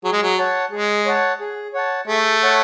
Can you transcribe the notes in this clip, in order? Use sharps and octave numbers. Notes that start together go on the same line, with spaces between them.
F#3 G#4
G#3
F#3
C#5 F#5 A5
G#3 G#4
C#5 F#5 A5
G#4
C#5 F#5 A5
A3 G#4
C#5 F#5 A5